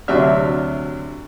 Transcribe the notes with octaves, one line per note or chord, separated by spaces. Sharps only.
D2 C3 F#3 D4 E5 F6